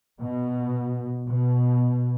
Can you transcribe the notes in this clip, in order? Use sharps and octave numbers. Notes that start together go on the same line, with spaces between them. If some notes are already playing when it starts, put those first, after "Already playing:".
B2
B2